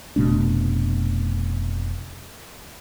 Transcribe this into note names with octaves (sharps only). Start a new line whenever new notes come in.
F1 B2 A3 D4